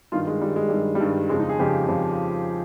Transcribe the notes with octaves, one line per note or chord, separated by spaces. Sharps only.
G2 D#3 F4
G#3
G2 D#3 G3
G#3
G2 D#3 G3
G3
G2 D#3
F2 C#3 F3 G#3
D#4
G#4
F2 C#3 F3 G4
F2 C#3 F3